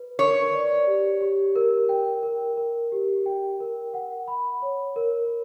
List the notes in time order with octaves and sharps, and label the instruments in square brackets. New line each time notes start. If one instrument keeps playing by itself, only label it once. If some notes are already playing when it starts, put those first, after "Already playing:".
Already playing: [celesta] B4
[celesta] A#4 [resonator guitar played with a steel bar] C#5
[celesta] D5
G4
G4
A#4
G5
A#4
A#4
G4
G5
A#4
F#5
B5
C#5
A#4